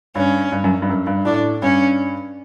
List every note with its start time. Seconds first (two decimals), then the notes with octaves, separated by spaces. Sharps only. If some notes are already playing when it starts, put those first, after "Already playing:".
0.15 G2 C#4
0.52 G2
0.64 F#2
0.82 G2
0.89 F#2
1.07 G2
1.25 A2 D4
1.62 G2 C#4